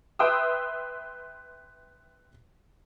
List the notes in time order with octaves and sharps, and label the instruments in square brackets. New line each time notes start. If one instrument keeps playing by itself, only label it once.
[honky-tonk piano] B4 E5 G5 C6 D#6 E6